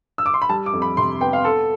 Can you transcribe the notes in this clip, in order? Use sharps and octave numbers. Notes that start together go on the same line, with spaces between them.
E6
D6
C6
B5
G3 A5
D6
F2
B5
C3 C6
B3 G5
F5
B3 A4